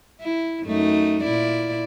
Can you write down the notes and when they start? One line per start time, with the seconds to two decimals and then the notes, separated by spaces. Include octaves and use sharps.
0.20 E4
0.65 F#2 A3 D#4
1.24 A#2 E4 D5